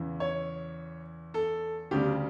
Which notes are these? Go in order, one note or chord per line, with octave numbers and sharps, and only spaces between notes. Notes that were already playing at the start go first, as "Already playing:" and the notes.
Already playing: E2 C#3 E3
C#5
A4
D2 C#3 G3 G4